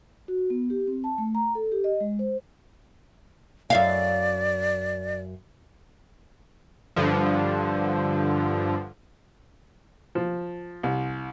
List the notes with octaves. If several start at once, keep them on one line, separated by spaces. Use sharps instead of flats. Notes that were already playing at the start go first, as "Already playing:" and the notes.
F#4
B3
G4
C4
A5
A3
A#5
A4
G4
D#5
G#3
C5
F#2 D5 E5 F5
G2 D3 F3
F3
C2